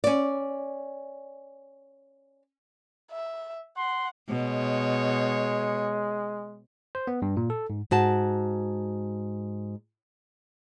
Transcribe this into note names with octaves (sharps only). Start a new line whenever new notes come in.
C#4 D5
E5
F#5 C6
B2 G#3 C#5
C5
B3
G2
A#2
A4
G#2
G#2 F#4 A5